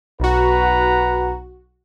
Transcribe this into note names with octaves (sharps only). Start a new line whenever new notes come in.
B1 F#4 B4 F#5 A#5